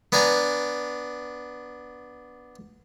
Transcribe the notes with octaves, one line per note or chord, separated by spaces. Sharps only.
B3 D4 G#5 A#5